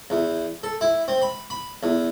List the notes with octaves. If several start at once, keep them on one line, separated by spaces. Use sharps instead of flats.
E2
A4
E4
C4
B5
B5
E2